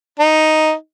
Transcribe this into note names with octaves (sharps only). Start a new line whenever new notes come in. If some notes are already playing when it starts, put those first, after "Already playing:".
D#4